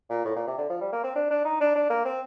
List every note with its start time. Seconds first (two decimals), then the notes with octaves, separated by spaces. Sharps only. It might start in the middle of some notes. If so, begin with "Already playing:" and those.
0.10 A#2
0.25 A2
0.35 A#2
0.47 C3
0.58 D3
0.70 F3
0.81 G3
0.92 A#3
1.03 C4
1.15 D4
1.30 D4
1.44 D#4
1.60 D4
1.75 D4
1.90 A#3
2.05 C4